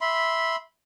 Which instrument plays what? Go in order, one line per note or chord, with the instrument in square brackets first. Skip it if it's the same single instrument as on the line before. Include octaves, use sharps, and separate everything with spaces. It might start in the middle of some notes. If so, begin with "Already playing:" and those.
[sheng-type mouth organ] E5 B5 C6